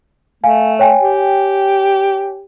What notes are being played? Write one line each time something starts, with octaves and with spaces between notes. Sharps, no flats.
A3 F5 G#5
C#5 G5 G#5
G4